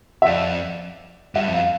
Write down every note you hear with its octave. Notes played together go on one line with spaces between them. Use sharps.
E5
F2 D5
G2 E5
F2
F5